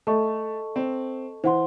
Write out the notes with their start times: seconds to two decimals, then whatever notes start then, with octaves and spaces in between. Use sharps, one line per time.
0.07 A3 A4 D#5 A5 C#6
0.76 C4
1.44 E3 C5 F#5 C6